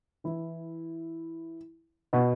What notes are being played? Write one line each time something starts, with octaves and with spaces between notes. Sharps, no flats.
E3 E4
B2 B3